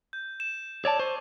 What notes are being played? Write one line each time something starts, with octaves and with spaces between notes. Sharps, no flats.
G6
E7
C#5 D5 A5 D6 E6
C5 C#6